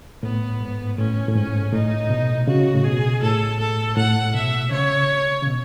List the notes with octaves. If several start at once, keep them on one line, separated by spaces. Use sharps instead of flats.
A2 B3
G#2
A2 C#4
A2
G#2 C#4
A2 D#4
B2
C#3 F#4
A2
B2 G#4
A2 A4
A4
A2 F#5
B2 E5
C#3 C#5
C#3
B2